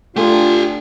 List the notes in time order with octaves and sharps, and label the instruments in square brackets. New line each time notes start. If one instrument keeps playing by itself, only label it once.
[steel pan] A3 A4 [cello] D4 [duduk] F4 [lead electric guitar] G4 G#5